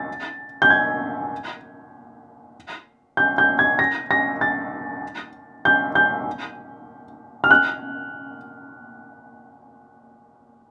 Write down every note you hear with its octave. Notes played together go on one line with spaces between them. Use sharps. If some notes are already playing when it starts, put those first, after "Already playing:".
Already playing: A6
G6
G#6
G6
G6
G#6
A#6
A#6
A6
G6
G6
F6
F#6